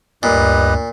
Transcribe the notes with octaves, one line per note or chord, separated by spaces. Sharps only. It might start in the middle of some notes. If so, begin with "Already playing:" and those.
D2 G2 A#2 G3 B4 D#5